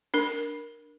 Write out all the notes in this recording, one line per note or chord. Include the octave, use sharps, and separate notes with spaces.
D4 A#4